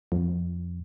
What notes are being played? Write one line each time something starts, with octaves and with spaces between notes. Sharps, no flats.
F2